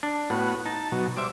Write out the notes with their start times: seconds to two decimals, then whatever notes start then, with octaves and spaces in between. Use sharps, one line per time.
0.03 D4
0.30 A2 B3 F#4
0.66 D#4 A5
0.92 B2 F#3
1.17 G3 C5 E5 D6